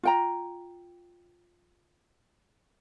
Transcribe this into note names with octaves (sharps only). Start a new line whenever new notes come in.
F4 G5 A#5